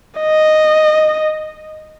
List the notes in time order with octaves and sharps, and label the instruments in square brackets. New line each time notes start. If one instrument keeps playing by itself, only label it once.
[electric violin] D#5